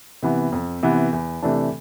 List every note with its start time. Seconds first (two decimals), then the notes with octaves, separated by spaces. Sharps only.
0.23 C3 E3 B3
0.52 F2
0.83 C3 E3 B3
1.13 E2
1.42 C3 E3 A3 D4